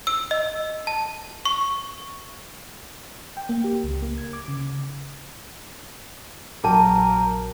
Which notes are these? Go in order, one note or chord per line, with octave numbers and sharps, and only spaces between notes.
E6
D#5
A5
C#6
G5
A#3
G4
C#2
A#3
G#6
D6
C#3
A#1 F#3 G#4 A#4 G5 A5